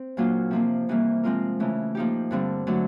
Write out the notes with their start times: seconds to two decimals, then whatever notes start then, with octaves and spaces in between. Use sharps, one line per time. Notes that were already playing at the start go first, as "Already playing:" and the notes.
Already playing: C4
0.17 A#2 F#3 A#3 D4 F4
0.51 C3 F3 A#3
0.89 C3 E3 G3 A#3
1.23 F3 G#3 C4 F4 A#4
1.60 C#3 E3 A3
1.95 F3 A#3 D#4 G4
2.31 G2 D3 G3 C4
2.67 D3 F#3 A3 D4